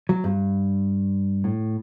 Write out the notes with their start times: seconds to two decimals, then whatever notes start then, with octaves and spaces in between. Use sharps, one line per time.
0.09 F#3
0.24 G2
1.44 A2